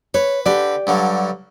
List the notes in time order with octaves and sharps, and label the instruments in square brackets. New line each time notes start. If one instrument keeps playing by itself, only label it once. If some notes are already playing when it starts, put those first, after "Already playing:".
[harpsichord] B4 [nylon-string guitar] C#5
[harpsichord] D3 B4 [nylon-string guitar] G4 D5
[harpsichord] G2 D3 F#3